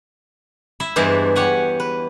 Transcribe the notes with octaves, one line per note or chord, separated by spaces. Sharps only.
E4 E5
E2 G2 E3 G#3 D4 C5
G4 C#5 F#5 G#5
B4